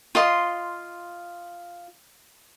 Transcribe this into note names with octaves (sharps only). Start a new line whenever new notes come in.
F4 D#5 C6